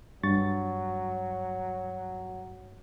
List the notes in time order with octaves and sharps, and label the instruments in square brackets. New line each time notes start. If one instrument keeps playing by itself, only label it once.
[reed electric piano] G2 C#6 A6 [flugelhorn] F#3